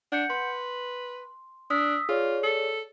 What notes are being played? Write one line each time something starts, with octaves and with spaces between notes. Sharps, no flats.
D4 F#5 G6 C#7
B4 C6
D4 D#6 E6 B6
F4 G#4 C#5 D5
A4